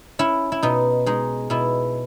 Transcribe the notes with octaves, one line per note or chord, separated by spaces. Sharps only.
C#4 E4
E4
B2 D#4
G#3 D#4
B2 E4